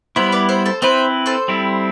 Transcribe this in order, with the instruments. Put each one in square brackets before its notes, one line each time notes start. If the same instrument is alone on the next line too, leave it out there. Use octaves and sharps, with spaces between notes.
[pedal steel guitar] G3 B3 E4 [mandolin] C5 E5
[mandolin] B4 D5
C5 E5
A4 C5
[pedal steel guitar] C4 E4 B4 [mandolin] C5 E5
[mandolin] A4 C5
[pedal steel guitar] G3 C4 E4